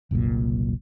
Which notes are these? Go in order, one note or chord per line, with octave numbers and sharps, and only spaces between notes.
F#1 C2 F#2 A#2